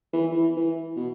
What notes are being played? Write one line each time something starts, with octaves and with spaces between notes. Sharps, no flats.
E3
E3
E3
B2